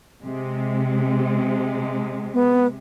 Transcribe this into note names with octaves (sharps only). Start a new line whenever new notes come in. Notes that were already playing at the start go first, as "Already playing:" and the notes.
C3 G#3
B3